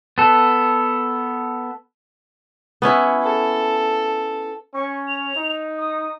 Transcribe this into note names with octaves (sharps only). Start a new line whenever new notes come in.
B3 A4
B3 C#4 E4
A4
C#4 C#6
F7
D#4
D#6